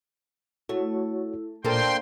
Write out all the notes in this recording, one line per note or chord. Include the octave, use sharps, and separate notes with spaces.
A3 E4 F#4 C#5
A#2 A#3 D4 A4 C5 D5 G5 C6